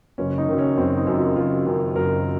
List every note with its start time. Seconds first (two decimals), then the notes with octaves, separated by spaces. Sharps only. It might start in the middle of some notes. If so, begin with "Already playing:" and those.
0.18 F#1 C#4
0.38 D#4
0.48 F#2 D#3
0.58 C#4
0.77 F#1 C4
0.97 D#4
1.06 F#2 D#3
1.17 F4
1.36 F#1 F4
1.66 F#2 D#3
1.96 F#1 A#4